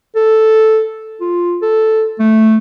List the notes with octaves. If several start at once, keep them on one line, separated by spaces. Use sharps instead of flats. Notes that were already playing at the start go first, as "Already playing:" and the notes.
A4
F4
A4
A3